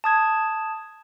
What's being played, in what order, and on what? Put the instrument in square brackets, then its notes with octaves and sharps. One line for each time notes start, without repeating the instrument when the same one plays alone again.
[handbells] A5 D#6 G#6